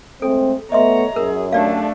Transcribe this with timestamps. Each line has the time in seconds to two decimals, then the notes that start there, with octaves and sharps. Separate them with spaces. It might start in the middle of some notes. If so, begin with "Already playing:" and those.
0.22 G#3 A3 C4 A4
0.72 A3 B3 C#5 D#5 E5 A#5 C6
1.16 F#2 G#4 A#4
1.52 A3 D4 G4 D5 F5